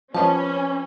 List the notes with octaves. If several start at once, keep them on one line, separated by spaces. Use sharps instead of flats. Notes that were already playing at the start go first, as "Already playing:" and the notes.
F3 G3 B3 C#4 A5